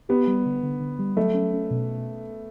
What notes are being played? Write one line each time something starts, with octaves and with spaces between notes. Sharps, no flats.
B3 G4
G3
D3
D3
D3
G3
F#3 A3
C#4
C#4
B2